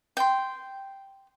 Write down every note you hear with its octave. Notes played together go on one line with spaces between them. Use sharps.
G5 C6